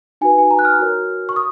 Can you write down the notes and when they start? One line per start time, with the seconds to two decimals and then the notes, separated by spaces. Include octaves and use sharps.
0.21 D#4 F#4 B4 G#5
0.38 G#5
0.51 A#5
0.59 F#6
0.65 F6
0.79 F#4 A#4 C#5
1.29 C#6
1.36 D#6